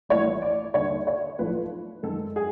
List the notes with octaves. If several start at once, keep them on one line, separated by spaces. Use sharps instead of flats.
A#1 A2 E3 G3 C#5
D5
D#2 D3 G3 C#5
C#5
B1 A2 F3 A3 B4
F#2 D#3 G#3 A4
G#4